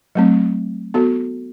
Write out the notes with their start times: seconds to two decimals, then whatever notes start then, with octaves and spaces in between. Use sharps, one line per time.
0.15 F#3 A3 C4
0.94 B3 F#4 A4